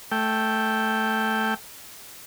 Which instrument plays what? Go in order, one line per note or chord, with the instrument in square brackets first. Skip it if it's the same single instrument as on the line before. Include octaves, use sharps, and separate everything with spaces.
[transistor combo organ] A3 G5